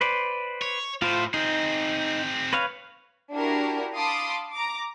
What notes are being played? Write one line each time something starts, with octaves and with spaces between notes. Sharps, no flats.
B4 C5 D5
C#5
A2 F4 C5
C4 D#4 G#4
B4 C#5 F5
D4 E4 F#4 G4 A#4
F5 A5 B5 C6 D6 D#6
A#5 D6